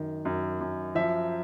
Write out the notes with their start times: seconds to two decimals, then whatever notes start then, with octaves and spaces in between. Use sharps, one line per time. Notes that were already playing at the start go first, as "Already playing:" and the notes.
Already playing: F#2 D#3
0.25 F#2
0.61 F#2
0.95 F3 E5